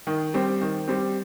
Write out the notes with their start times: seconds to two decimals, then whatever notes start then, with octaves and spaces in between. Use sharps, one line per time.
0.07 D#3
0.34 G3 C4
0.61 D#3
0.88 G3 C4